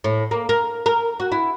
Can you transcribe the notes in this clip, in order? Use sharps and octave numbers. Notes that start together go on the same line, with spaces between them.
A2
A#3
A#4
A#4
F#4
E4